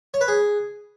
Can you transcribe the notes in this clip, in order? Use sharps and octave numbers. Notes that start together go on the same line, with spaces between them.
C#5
B4
G#4